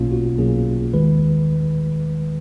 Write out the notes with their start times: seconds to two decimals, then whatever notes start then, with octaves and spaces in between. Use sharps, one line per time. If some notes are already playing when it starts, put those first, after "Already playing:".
Already playing: B1 B2 A#3 C#4 F4
0.12 F#4
0.38 B1 B2 A#3 C#4 G#4
0.93 D#2 D#3 G#3 B4